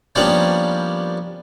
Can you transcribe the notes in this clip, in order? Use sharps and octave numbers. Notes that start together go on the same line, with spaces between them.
F3 G3 A#3 B3 C#4 D4